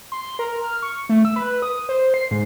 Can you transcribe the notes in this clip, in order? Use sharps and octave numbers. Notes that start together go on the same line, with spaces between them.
C6
A#4
F6
C#6
A3
E6
B4
D#6
C5
C7
G#2